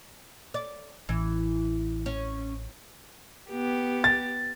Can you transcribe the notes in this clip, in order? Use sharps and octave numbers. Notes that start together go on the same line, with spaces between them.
D5
A1 E3
C#4
B3 G4
A6